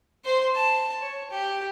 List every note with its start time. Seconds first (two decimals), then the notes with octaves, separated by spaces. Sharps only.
0.25 C5 C6
0.55 A5
1.02 C#5
1.31 G4